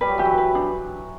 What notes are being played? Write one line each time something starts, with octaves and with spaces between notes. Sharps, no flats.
G3 B4
F#3
E3 G4
F#3
B4
D4